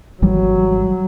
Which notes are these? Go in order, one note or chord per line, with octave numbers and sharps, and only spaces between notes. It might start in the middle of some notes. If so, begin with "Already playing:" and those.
G#1 E3 F#3 G3